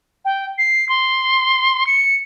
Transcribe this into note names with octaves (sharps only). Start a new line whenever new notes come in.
G5
C7
C6
C#7